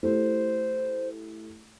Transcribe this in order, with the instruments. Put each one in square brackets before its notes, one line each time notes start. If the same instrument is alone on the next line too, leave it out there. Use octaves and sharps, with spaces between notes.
[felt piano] A3 E4 G4 [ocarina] C5